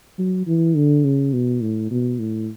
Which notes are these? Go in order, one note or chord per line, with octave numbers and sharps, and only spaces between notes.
F#3
E3
D3
C#3
B2
A2
B2
A2